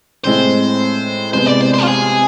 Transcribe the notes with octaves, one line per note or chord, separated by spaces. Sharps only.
A2 G#3 C4 C5
C3 G#3 B3 C5
D5
C5
C5
F4
G#4